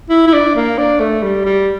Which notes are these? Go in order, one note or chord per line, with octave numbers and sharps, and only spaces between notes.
E4
E4
D4
A#3
D4
A3
G3
G3